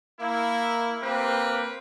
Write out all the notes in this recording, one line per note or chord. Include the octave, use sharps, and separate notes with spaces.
A#3 E4
A#3 C4 G4 B4